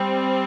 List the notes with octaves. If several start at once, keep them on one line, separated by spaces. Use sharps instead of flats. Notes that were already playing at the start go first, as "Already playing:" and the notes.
Already playing: G3 C4